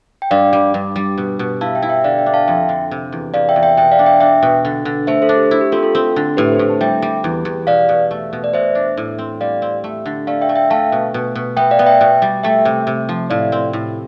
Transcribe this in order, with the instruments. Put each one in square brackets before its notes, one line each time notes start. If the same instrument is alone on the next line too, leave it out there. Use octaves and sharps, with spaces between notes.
[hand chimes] G5
[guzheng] G2 [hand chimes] D5 F5
[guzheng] G3
G2
G3
B2
B2
[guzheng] E4 [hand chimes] F5 A5
[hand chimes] E5 G5
[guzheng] E4
[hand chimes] E5 G5
[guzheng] D3 [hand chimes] D5 F5
[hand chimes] E5 G5
[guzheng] D4
[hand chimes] F5 A5
[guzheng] F2 [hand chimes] E5 G5
[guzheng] D3
C3
E2
[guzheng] E2 [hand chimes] D5 F5
[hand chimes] E5 G5
[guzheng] E2
[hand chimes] E5 G5
[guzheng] B2 [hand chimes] E5 G5
[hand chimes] D5 F5
[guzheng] D4
[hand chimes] E5 G5
[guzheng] D4 [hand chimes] E5 G5
[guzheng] B2
D3
D3
[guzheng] A3 [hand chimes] C5 E5
[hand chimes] A4 C5
[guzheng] D4
[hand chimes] G4
[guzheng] E4
[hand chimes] G4
[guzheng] C4 [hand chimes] F4 A4
[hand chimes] F4 A4
[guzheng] C4
D3
[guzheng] A2 [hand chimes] G4 B4
[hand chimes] A4 C5
[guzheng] A2
[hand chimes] A5
[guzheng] G3 [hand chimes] E5 G5
[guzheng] G3
E2
E2
[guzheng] B2 [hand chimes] D5 F5
[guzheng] B2
A3
B2
[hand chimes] D5
[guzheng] B2 [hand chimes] C5 E5
[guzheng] D4
A2
C4
[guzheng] G3 [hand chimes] D5 F5
[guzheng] C4
A3
D3
[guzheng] A3 [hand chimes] D5 F5
[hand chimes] E5 G5
[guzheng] A3
[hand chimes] E5 G5
[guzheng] A3 [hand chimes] F5 A5
[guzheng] B2
B2
B2
[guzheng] B3 [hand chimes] E5 G5
[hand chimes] D5 F5
[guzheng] B3
[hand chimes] E5 G5
[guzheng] B2
G3
[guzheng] A3 [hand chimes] E5 G5
[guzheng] C3
C3
F3
[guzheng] A2 [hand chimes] D5 F5
[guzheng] C4
A2